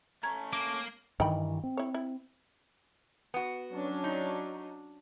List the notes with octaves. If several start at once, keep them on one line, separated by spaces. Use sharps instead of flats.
A3 C#4 A#5 G#6
A#3 D6
G2 D#3 E3 D#4 G5 B5
C4
E4 C#5
E4
B3 F#4
F#3 C#4 D4
D#4